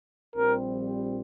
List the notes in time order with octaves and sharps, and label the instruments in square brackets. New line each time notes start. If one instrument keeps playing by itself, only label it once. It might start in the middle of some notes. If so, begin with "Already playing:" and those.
[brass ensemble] A#1 A#2 G3 C4 [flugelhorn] A#4